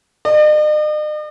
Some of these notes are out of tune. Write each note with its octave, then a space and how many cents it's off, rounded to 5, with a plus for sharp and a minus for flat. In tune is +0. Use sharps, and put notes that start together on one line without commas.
D#5 -45